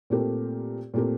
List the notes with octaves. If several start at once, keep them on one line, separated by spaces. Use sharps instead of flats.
A#2 A3 C4 G4 A#4
A#2 A3 C4 G4 A#4